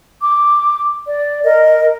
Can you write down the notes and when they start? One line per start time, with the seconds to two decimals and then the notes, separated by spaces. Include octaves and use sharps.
0.21 D6
1.06 D5
1.43 A#4 D#5